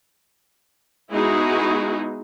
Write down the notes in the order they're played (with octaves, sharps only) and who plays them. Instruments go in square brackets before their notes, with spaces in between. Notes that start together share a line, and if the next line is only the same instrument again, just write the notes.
[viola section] G#3 B3 D#4 E4 F#4 G#4